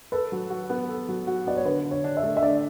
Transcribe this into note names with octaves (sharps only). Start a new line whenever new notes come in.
A4 B4
F#3
F#4
B3
A4
F#3
F#4
B3 D5
C#5
D3 B4
D3
C#5
D4
E5
A3
E5
D3 D5